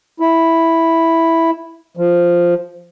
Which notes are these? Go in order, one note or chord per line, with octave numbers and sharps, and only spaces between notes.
E4
F3